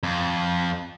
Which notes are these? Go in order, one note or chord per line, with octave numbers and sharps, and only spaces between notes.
F2